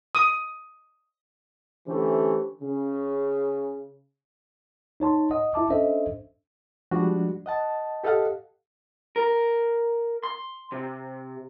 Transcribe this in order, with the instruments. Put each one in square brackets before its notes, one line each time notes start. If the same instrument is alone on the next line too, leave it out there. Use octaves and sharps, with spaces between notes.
[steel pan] D#6
[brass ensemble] D3 E3 A3 C#4 G4 C5
C#3
[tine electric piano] D#4 C#5 A5 C6
D#5 F#5 D#6
E4 E5 A5 D6
C#4 D4 A4 C5 D#5 E5
[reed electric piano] F3 G3 G#3 D4 F#4
D#5 F#5 A5
G4 A4 D#5 F5 F#5
[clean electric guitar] A#4
C6
C3